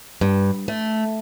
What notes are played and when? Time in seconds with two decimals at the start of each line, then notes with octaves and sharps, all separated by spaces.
0.21 G2
0.68 A3